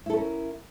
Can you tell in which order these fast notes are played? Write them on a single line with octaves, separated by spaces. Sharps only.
E4 A4 C#4 A#4